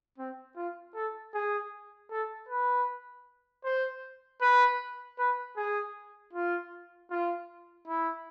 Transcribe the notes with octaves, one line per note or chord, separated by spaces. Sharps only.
C4
F4
A4
G#4
A4
B4
C5
B4
B4
G#4
F4
F4
E4